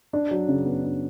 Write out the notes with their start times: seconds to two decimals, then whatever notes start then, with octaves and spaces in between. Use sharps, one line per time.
0.13 D4
0.31 F#3
0.48 C#3
0.66 B3
0.84 D4